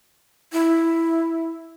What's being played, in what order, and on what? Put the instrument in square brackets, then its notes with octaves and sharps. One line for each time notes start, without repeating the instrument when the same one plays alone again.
[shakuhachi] E4